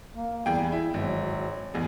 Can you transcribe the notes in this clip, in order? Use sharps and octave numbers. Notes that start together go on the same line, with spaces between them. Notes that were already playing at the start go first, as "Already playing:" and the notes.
A#3
E2 G3 G#4 G5
E4
G#1 F#3
A1 E2